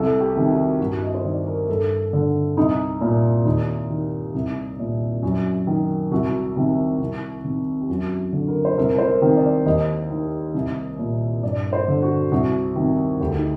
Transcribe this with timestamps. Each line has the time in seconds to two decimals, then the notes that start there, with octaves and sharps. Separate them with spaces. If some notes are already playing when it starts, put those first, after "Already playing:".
Already playing: C2 A4
0.20 G4
0.36 C3 D#3
0.50 F#4
0.80 G2 F#4
1.02 D#5
1.14 C5
1.25 D#3 D5
1.47 A#4
1.68 G2 A4
2.13 D3
2.57 C2 D#4
3.01 A#2
3.45 D#2 D#4
3.90 D#3
4.34 C2
4.79 A#2
5.23 F#2 F#4
5.67 D#3
6.12 C2 F#4
6.56 C3 D#3
7.00 C2
7.44 C3 D#3
7.81 G4
7.89 F#2 F#4
8.32 D3
8.48 A#4
8.65 C5
8.77 C2 A#4
8.98 C5
9.07 A#4
9.22 C3 D#3
9.37 D5
9.66 D#2 D#5
10.10 D#3
10.54 C2
10.99 A#2
11.43 G2 D5
11.73 C5
11.88 D3
12.02 F#4
12.32 C2 F#4
12.76 C3 D#3
13.20 D2 G4
13.38 D#4